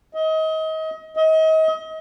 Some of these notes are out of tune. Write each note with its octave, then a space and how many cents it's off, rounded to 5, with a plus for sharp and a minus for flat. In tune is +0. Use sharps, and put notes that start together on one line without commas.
D#5 +30
D#5 +35